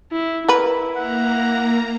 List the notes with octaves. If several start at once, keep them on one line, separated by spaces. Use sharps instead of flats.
E4
E4 A#4 B4
A#3 F#5 A#5